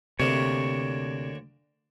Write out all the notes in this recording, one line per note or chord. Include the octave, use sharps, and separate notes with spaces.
D2 C3 A#3 D4 C#5